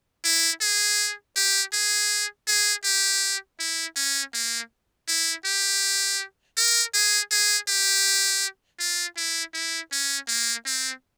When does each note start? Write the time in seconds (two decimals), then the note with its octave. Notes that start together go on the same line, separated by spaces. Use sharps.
0.25 E4
0.61 G#4
1.36 G4
1.73 G#4
2.48 G#4
2.85 G4
3.60 E4
3.96 C#4
4.34 A#3
5.08 E4
5.45 G4
6.57 A#4
6.94 G#4
7.31 G#4
7.68 G4
8.80 F4
9.17 E4
9.54 E4
9.92 C#4
10.28 A#3
10.66 C4